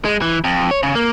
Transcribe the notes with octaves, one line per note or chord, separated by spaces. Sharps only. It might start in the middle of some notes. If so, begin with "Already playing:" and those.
G#3
E3
F2
C#5
C#3
A#3